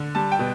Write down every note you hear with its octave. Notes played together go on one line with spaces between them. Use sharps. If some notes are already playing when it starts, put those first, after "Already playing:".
Already playing: D3
G3 A5
G5
B2